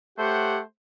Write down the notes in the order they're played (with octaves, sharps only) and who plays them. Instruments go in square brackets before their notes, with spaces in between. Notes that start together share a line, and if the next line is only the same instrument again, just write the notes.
[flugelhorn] A3 [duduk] G4 [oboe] C5 [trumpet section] C#5 F#5